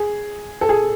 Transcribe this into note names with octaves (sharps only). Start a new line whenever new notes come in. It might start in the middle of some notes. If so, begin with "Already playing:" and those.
Already playing: G#4
A4
G#4